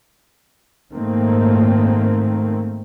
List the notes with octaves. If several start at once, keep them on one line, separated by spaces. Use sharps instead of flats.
G#2 D#3 A3 A#3 C4